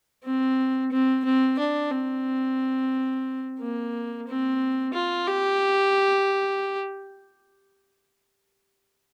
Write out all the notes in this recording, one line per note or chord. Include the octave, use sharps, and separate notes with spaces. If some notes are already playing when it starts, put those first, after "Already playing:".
C4
C4
C4
D4
C4
A#3
C4
F4
G4